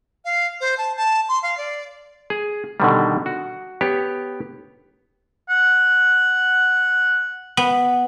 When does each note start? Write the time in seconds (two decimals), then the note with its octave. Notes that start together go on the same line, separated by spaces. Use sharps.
0.25 F5
0.61 C5
0.78 A5
0.97 A5
1.29 C6
1.43 F5
1.58 D5
2.30 G#4
2.80 B2 D3 D#3 G3
3.26 F#4
3.81 B3 G4 C#5
5.49 F#5
7.57 B3